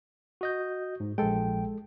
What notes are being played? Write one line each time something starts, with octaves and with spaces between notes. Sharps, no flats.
F#4 D#5 G6
G#2
A#1 G#3 A4 G5